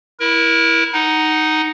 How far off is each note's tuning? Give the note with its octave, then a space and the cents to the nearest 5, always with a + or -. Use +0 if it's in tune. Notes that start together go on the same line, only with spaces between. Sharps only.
E4 -5 A#4 +30
D#4 +0 F#5 +10